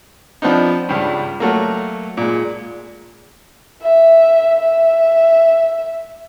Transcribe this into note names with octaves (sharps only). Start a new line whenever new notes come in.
F3 B3 C4 D4 D#4
C#2 G2
F#3 A3 A#3
A#2 G#3
E5
E5